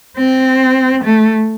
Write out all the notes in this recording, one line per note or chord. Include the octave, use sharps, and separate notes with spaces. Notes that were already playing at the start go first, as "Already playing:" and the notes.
C4
A3